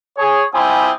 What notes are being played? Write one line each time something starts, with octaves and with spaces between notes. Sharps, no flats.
G#4 C#5
G3 C4 E4 F4 G#5 D#6